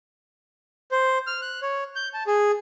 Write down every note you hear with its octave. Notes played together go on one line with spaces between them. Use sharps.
C5
F6
F#6
C#5
G6
A5
G#4